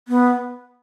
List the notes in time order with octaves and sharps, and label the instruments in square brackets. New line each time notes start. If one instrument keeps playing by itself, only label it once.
[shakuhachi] B3